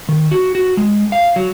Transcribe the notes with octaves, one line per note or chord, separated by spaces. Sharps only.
D#3
F#4
F#4
G#3
F5
F#3